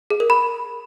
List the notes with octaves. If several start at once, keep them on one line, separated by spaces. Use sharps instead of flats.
G#4
A#4
B5